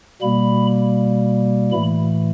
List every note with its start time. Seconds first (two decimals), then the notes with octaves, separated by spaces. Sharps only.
0.21 B2 G3 A#3 B5
1.72 A2 E3 A3 B5